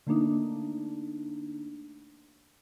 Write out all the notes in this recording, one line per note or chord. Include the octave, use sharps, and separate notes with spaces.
D3 A3 A#3 D4 D#4